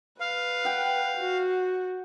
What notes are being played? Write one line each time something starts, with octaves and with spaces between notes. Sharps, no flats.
B4 F5
F#5 G5
F#4